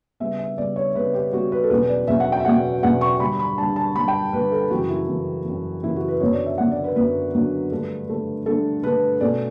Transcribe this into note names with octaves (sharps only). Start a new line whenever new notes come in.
C#3 G3 B3 E5
E5
C#3 G3 B3 D5
C#5
C#3 G3 B3 B4
G4
C#3 G3 B3 F#4
B4
A4
E2 B2 F#3 C#4 B4
D5
E2 B2 F#3 C#4 E5
F#5
G5
E5
E2 B2 F#3 C#4 F#5
E2 B2 F#3 C#4 F#5
C#6
G2 D3 G3 B5
B5
G2 D3 G3 A5
A5
G2 D3 G3 B5
G5
G2 D3 G3 B4
A4
F#2 C#3 E3 F#4
E4
F#2 C#3 E3
F#2 C#3 E3
F#2 C#3 E3 E4
F#4
B4
F#2 D3 F#3 B3 C#5
D5
E5
F#2 D3 F#3 B3 F#5
D5
B4
F#2 D3 F#3 B3 B4
F#2 D3 F#3 B3
G2 D3 A3
G2 D3 A3
G2 D3 A3 A4
G2 D3 A3 B4
B2 A3 C#4 D5